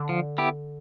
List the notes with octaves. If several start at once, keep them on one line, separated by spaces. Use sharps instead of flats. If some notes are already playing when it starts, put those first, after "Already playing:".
Already playing: D3
F3
B3 E4 G4